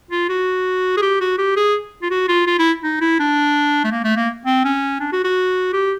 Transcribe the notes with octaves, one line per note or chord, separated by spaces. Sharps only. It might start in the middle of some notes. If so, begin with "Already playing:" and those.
F4
F#4
G#4
G4
F#4
G4
G#4
F4
F#4
F4
F4
E4
D#4
E4
D4
A3
A#3
A3
A#3
C4
C#4
D4
F#4
F#4
G4